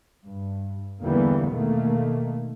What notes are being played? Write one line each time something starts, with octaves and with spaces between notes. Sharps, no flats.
G2
E2 D3 E3 G3 A#3 B3
B2 D#3 A3 A#3